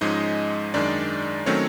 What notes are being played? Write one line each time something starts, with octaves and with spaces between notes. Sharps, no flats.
G#2 F3 G#3 C#4 D#4 D#5
F#2 D#3 G#3 D4 D5
D#3 F#3 A3 C4 C#4 C#5